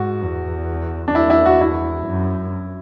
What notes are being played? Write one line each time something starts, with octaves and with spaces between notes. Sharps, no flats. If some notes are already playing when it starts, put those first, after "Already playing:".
Already playing: G#2 F#4
E2
D4
E2 E4
E4
F#4
E4
F#2